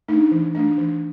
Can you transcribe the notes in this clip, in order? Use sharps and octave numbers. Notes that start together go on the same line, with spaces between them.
A3 D4 D#4
E3
A3 D4
E3